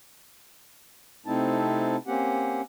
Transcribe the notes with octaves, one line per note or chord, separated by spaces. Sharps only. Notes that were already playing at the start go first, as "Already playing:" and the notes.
C3 A3 C4 D#4 E4 A5
A#3 C4 C#4 G4 F#5